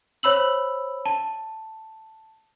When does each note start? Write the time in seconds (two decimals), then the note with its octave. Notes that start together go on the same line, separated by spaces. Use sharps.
0.23 C5 C#5 B5 E6 F#7
1.06 A5